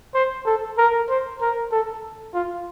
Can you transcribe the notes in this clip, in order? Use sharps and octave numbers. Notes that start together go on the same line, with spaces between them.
C5
A4
A#4
C5
A#4
A4
F4